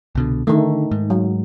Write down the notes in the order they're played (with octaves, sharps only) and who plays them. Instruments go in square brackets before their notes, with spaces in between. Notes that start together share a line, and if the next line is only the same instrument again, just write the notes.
[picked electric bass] C2 B2 D3
[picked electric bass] D3 [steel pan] D#3 A3
[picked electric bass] G#2
[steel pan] F#3